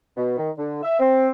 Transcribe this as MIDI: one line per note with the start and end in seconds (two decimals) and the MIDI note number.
0.17 0.37 47
0.38 0.50 51
0.58 0.79 50
0.83 0.99 76
1.00 1.30 60